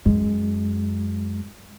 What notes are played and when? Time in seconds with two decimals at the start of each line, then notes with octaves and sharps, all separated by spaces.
0.05 F#2 G#3